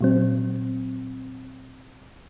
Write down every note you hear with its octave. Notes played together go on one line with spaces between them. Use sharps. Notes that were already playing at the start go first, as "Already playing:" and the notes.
A#2 F#3 C4